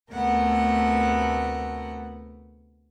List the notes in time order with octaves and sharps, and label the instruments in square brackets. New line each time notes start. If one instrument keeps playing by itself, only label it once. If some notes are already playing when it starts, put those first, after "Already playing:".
[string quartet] D2 C3 A3 B3 A#4 F#5